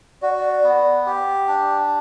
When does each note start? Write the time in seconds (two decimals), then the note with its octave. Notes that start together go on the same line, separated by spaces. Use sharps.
0.22 F#4 D5
0.37 D5
0.64 B3
1.06 G4
1.48 D4